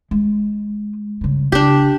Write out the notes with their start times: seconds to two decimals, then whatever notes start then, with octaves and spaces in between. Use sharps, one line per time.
0.11 G#3
1.21 C#3 G3
1.52 C#3 D4 G4